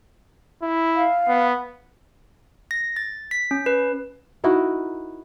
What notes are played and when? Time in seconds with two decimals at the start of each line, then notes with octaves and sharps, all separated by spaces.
0.62 E4
0.96 F5
1.28 B3
2.71 A#6
2.96 A6
3.31 B6
3.51 C#4
3.66 B4
4.44 D#4 E4 F#4 A#4